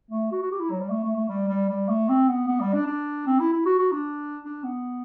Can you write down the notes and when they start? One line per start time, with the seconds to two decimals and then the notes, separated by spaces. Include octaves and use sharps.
0.11 A3
0.32 F#4
0.42 F#4
0.51 G4
0.60 E4
0.70 F#3
0.80 G3
0.90 A3
1.04 A3
1.16 A3
1.29 G3
1.49 G3
1.69 G3
1.89 A3
2.09 C4
2.28 B3
2.48 B3
2.60 G3
2.74 D4
2.87 D4
3.27 C4
3.40 E4
3.53 E4
3.65 F#4
3.78 F#4
3.92 D4
4.45 D4
4.64 B3